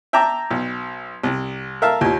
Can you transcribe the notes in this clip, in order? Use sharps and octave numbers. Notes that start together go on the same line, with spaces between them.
E5 G5 A5 A#5 D6
B1
C2
A#4 E5 F5 A5
D#2 A#2